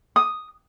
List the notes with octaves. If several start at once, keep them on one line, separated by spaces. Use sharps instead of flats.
D#6